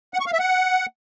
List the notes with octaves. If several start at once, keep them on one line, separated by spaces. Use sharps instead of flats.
F#5
C#6
F5
E5
F#5